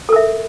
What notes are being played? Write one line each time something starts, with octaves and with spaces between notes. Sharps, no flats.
A4 A#4 E5